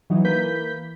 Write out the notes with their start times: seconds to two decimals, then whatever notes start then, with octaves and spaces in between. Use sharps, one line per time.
0.10 E3 F#3 D#4
0.24 E3 A#3 B4 G6 B6